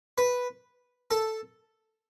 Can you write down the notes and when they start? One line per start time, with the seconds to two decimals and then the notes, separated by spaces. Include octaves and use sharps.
0.18 B4
1.11 A4